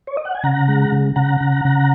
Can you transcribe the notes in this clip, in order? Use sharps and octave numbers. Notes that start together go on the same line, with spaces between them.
C#5
D#5
F#5
G#5
C#3 F#5 A#5
G#3
C#3
C#3 F#5 A#5
C#3
C#3